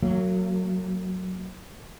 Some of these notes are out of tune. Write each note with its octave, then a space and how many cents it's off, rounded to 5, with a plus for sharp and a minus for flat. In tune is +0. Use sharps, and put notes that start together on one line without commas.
F#3 +0 A#3 -40